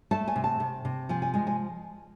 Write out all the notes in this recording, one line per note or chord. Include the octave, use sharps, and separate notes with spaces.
A3 A5
G#5
C3
A5
C3
C3
F3 G#5
G#5
G#3 G#5
G#5